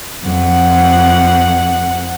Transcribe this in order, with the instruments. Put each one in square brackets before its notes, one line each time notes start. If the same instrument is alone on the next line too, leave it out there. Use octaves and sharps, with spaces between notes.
[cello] F2 F#5